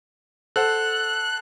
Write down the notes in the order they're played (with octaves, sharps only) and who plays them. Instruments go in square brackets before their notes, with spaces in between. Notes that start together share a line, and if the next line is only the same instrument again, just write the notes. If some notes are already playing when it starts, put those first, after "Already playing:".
[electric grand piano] A4 C5 F#5 [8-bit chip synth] F#6